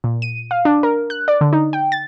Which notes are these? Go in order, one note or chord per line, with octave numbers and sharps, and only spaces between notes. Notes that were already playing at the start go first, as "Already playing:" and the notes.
A#2
D#7
F5
D4
A#4
F#6
D5
D3
D#4
G5
A6